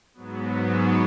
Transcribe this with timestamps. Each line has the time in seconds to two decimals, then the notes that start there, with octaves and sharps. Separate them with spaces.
0.14 G#2 F#3 B3